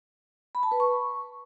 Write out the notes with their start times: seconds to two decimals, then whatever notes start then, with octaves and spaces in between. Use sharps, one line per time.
0.55 B5
0.63 A5
0.72 B4
0.80 C#6